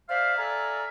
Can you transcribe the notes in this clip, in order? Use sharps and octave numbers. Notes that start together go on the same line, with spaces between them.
C5 D5 E5 F5
A4 D5 E5 F5 G#5 A#5